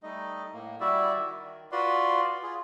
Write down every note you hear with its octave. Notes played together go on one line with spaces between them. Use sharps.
G3 A3 D#4 D#5
A2 A#3
G3 E4 F#4 D5 E5
D#3
F4 F#4 B4 D5 C6
F4 G#4